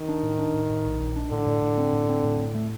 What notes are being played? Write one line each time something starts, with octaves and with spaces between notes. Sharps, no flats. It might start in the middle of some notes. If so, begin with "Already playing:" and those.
Already playing: D#3
D4
A2
D4
A2
A2
A#1
A#1
D4
A2 D3
A2
A2
C4
A2
C4
A2
A2
A3